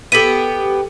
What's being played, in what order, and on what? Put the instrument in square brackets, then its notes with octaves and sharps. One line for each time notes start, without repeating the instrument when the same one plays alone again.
[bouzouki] B3 G4 [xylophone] A4 B6 D#7